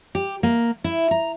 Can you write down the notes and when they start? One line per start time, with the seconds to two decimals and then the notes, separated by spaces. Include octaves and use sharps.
0.15 G4
0.43 A#3
0.84 E4
1.11 A#5